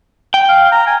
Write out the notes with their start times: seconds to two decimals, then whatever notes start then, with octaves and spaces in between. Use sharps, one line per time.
0.34 G5
0.49 F5
0.72 A#5
0.87 G#5